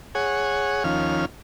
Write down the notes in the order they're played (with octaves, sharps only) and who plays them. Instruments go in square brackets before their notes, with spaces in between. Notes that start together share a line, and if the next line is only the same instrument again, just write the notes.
[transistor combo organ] G#4 C#5 F#5
D#2 F3 C#4 F6